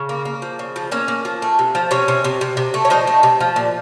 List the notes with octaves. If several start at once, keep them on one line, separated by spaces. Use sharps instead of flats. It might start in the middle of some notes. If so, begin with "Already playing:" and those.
Already playing: C#3
A#3
A#3
F3
C#3
F3
A#3 C#4 C#5
A#3
F3
A3
C3
F3
C3 C#4 C#5
C3
C3
C3
C3
A3
C#5
F3 D#4 D#5
A3
C3
F3
A#2